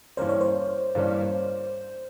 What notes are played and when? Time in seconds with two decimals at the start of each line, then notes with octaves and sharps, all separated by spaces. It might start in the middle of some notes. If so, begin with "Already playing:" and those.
0.17 G2 E3 G3 A#3 C#4 C5
0.29 C#5
0.41 C5
0.95 G2 E3 G3 A#3 C#4